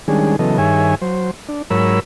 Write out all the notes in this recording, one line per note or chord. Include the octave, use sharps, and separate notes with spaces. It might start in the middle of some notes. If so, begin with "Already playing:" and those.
D#3 G3 G#3 C#4 D4 G#4
C#3 E3 F#3 B3 A4 D#5
G2 D#3 G#4 C#5 E5 G#5
F#3 C5
D4
G#2 F#3 A#4 C#5 B5 E6